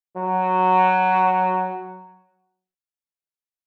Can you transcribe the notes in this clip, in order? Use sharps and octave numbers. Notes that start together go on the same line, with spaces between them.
F#3